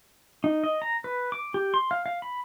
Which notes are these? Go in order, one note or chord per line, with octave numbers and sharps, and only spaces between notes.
D#4
D#5
A#5
B4
D6
G4
C6
F5
F5
B5